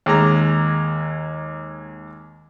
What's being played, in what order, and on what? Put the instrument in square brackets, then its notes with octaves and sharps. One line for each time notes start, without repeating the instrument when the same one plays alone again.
[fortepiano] D#2 G#3 A#5